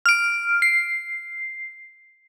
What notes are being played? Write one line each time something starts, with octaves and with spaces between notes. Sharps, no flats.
F6 D7
C7